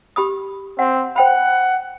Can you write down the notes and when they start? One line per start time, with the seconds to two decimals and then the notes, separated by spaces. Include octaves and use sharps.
0.16 G4 B5 D#6
0.79 C4 F#5
1.16 C5 F#5 G5 B5